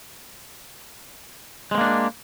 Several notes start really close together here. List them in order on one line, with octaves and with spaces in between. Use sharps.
G#3 C4 A#3 D4